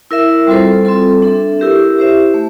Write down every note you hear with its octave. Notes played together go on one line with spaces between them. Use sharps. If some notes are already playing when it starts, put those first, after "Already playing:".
E4 A#4 E5
G3 C4 F4 A4 C5
G3 C4 F4 A4
D4 A4 E5
E4 G4 A#4 E5
E4 G4 C5 E5
A3